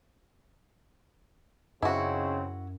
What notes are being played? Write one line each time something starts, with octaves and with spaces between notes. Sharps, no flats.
F#2 C#3 C4 D#4 E4 F#4